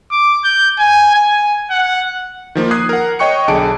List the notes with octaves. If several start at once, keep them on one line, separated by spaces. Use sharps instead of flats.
D6
G6
G#5
G#5
F#5
D#3 F3 A#3
D#6 F#6 G#6 C7
A#4 F#5
C#5 D#5 G5 C#6 F#6 C#7
B1 D3 G#4 A5 D6 D7